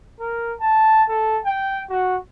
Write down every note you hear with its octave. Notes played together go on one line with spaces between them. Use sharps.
A#4
A5
A4
G5
F#4